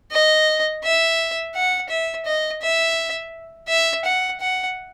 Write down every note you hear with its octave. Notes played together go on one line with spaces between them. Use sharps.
D#5
E5
F#5
E5
D#5
E5
E5
F#5
F#5